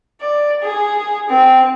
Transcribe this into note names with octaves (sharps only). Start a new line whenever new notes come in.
D5
G#4
C4